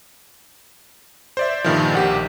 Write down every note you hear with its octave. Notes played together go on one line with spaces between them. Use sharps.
C5 D5 E5
G2 A#2 D#3 F3
A#1 G4 F#5